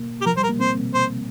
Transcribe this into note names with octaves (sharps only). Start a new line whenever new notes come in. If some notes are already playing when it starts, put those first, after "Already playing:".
Already playing: A#3
G4
F3 A#4
G3 C5
A#4
A#3
C4 C5
C5